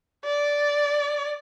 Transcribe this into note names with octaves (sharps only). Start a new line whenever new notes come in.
D5